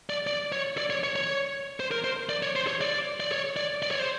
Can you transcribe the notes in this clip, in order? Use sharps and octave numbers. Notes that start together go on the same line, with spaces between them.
D5
D5
C#5
D5
C#5
C#5
C#5
C5
A#4
C5
D5
C#5
C5
C#5
D5
D5
C#5
D5
D5
C#5
C5